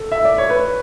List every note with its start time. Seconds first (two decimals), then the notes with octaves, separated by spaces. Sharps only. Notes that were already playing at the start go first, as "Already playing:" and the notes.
Already playing: A4
0.12 E5
0.25 D5
0.38 C#5
0.50 B4